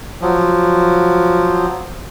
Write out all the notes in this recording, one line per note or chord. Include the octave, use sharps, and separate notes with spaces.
F3 F#3